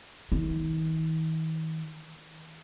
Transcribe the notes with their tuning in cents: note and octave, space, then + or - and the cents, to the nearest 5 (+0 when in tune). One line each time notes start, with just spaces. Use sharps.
D#3 +45